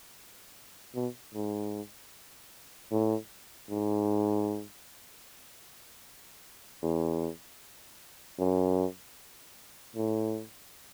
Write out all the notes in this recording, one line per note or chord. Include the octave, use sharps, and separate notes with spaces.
B2
G#2
A2
G#2
E2
F#2
A2